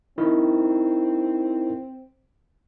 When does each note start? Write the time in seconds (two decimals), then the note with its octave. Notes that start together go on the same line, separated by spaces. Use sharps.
0.18 C4 D#4 E4 A#4